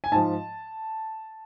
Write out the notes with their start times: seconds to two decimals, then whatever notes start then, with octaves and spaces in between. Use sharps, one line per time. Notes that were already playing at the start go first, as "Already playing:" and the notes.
0.04 G#5
0.12 G#2 F3 A5